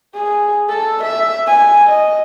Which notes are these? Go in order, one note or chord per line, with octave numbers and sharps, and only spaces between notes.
G#4
A4
E5
G#5
D#5